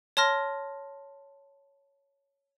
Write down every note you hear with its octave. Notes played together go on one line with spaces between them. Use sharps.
C#5 A5 C6 F6 A#6